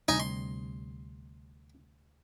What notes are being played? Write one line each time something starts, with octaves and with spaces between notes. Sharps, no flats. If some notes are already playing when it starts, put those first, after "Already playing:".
D2 C3 G3 D#4 G#5
C6